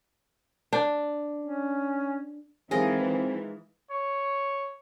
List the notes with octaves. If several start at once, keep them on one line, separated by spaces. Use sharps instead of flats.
D4
C#4
E3 G#3 C4 D#4 F4 G#4 A#4 D#5
C#5